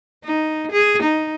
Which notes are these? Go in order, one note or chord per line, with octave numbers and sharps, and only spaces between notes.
D#4
G#4
D#4